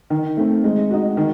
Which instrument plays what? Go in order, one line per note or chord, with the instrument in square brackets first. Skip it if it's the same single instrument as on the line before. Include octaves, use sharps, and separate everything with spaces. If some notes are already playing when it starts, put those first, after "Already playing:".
[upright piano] D#3
A3 C4
G#3
D#4 F#4
D#3